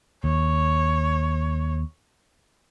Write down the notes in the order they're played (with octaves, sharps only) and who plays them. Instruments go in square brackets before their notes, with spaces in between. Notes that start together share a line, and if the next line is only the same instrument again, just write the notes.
[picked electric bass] D#2 [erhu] C#5